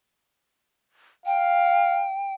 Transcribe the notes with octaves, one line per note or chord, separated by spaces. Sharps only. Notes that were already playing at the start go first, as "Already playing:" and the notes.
F5 G5